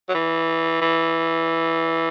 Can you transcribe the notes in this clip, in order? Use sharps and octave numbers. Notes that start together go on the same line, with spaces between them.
F#3
E3
E3